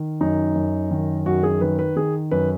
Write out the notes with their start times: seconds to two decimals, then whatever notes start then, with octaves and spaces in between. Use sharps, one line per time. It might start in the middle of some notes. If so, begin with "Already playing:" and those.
Already playing: D#3
0.21 F#2 D#4
0.55 F#2
0.91 D#3
1.26 F#2 F#4
1.43 G#4
1.61 D#3 B4
1.79 B4
1.96 D#3 G#4
2.31 F#2 B4